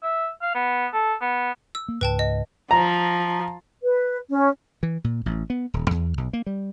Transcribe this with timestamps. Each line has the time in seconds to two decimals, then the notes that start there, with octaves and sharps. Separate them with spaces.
0.03 E5
0.42 F5
0.55 B3
0.93 A4
1.22 B3
1.75 E6
1.89 A#3
2.01 C#2 G#2 B4 G5 A5
2.19 D#5
2.71 F3 A#5
3.83 B4
4.30 C#4
4.83 E3
5.04 A#2
5.26 A1
5.50 B3
5.74 D#1
5.91 E2
6.17 B1
6.33 A#3
6.47 G3